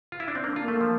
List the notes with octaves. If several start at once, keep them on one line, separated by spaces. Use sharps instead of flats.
F4
E4
D4
C4
A#3 D4
F4
A#3
A3
F3